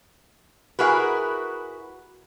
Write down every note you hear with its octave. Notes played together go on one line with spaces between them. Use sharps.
E4 F#4 G#4 A#4 B4